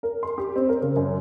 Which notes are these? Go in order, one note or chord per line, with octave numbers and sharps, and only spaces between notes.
A#4
C6
G4
C4
A#4
C#3
F#2